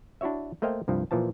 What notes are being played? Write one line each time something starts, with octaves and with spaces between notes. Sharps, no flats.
D4 E4 F#4 C#5 E5
A3 A#3 C5 D#5 F5 G5
C2 G2 F3
A#2 E3 F3 A5